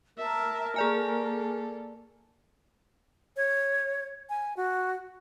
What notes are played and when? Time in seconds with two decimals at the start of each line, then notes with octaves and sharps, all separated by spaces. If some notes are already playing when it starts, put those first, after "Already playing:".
0.17 A#4 E5 A5
0.76 A#3 G#4 A4 D5 G#5
3.37 C#5
4.29 G#5
4.57 F#4